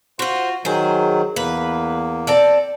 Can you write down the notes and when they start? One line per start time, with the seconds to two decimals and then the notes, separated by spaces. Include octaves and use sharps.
0.19 F4 F#4 C5 C6
0.65 D#3 F#3 G#4 C5
1.36 E2 A#3 B4
2.27 C4 A4 D5